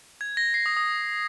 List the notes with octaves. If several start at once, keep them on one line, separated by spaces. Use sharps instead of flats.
G#6
A#6
C7
D#6
D#6